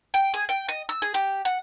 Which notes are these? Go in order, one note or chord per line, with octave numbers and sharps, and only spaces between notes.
G5
G#4
G5
D#5
E6
G#4
G4
F#5